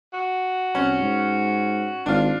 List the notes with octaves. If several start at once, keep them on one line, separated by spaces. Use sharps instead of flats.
F#4
C2 C#4
G#2
G#1 D4 F4